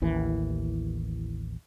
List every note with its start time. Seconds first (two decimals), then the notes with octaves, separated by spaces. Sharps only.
0.02 A1 D#2 E3